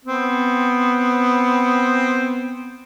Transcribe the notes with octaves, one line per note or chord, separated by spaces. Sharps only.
B3 C4